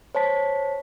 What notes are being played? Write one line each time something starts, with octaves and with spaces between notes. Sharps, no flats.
C5 C#5 A5 B6